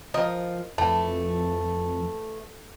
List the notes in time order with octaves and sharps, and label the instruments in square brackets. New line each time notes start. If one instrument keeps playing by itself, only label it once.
[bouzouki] F3 [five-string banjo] A#4 D#5
[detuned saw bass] F2 [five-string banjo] E3 [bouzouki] A3 [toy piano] A5